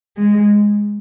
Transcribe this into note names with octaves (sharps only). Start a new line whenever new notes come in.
G#3